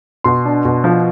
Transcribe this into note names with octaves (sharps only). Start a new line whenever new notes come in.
B2 C6
D4
B2
F3